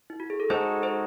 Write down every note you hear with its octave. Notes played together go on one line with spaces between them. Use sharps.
E4
F#4
G#4
A4
G#3 D#4 F#4 G#4 A4 C5
G#4 C5